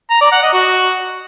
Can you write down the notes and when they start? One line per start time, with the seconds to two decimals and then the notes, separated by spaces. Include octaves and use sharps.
0.11 A#5
0.21 D5
0.32 F#5
0.43 D#5
0.53 F#4